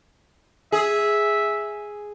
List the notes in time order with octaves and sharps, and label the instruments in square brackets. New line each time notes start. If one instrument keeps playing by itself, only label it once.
[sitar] G#4 [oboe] E5